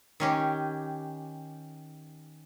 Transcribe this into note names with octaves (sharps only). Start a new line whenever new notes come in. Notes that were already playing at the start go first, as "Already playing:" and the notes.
D#3 C#4 G4